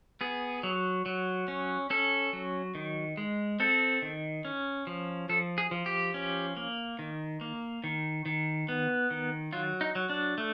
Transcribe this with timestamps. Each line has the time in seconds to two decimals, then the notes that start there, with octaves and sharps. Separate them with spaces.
0.21 B3 G#4
0.63 F#3
1.06 F#3
1.48 C#4
1.90 C#4 A4
2.33 F#3
2.75 D#3
3.17 G#3
3.60 C4 A4
4.02 D#3
4.45 C#4
4.87 F3
5.29 F3 A4
5.58 G#4
5.71 F3
5.86 G4
6.14 C#4
6.57 A#3
6.99 D#3
7.41 A#3
7.84 D#3
8.26 D#3
8.68 B3
9.11 D#3
9.53 F#3 F4
9.81 D#4
9.95 F#3
10.10 D4
10.38 A3